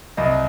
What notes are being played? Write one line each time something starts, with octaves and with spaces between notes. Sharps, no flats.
C2 D#5